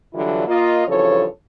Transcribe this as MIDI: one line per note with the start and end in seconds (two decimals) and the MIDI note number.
0.14 0.44 43
0.14 0.44 50
0.14 0.44 52
0.14 0.44 54
0.14 0.44 64
0.14 0.44 65
0.48 0.85 58
0.48 0.85 65
0.48 0.85 75
0.87 1.25 43
0.87 1.25 49
0.87 1.25 52
0.87 1.25 53
0.87 1.25 69
0.87 1.25 73